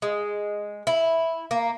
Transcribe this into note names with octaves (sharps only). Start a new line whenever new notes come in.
G#3
E4
A#3